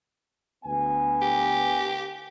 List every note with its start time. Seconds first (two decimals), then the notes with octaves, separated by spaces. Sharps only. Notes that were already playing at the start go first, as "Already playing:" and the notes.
0.65 D2 B3 G#5
1.22 G4